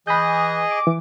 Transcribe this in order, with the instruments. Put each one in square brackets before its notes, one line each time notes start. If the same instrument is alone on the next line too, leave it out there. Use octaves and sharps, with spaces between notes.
[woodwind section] E3 [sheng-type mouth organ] G#4 D#5 [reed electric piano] B5 G6
[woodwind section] D6
[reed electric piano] E3